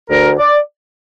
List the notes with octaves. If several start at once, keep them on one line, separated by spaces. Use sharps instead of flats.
D2 A#4
D5